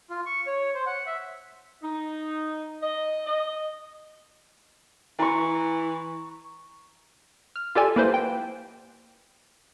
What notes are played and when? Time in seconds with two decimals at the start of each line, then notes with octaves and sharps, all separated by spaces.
0.10 F4
0.26 C#6
0.47 C#5
0.74 C5
0.86 F#5
1.06 E5
1.83 D#4
2.82 D#5
3.26 D#5
5.19 E3 A#5 C#6
7.56 F6
7.75 F4 G4 A4 D5 G#5
7.96 A#3 E4 B4 C5
8.14 G5